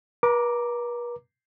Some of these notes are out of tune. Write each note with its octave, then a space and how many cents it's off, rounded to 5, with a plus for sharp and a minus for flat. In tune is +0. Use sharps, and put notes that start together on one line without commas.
B4 -45 A#5 +0 D6 +0